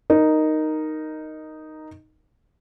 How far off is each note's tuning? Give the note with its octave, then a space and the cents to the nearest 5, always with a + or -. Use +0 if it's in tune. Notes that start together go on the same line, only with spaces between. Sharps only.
D#4 -5 A#4 +0